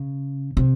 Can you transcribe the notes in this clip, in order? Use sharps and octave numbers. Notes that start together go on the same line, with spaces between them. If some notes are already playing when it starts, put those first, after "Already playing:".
Already playing: C#3
C3